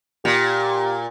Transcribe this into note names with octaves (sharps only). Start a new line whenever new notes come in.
A#2 G4